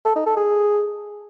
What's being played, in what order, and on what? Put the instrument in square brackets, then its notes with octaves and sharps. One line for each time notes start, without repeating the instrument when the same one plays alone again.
[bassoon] A4
D#4
A4
G#4